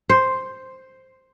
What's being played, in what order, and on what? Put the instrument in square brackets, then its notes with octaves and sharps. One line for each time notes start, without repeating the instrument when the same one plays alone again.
[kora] C5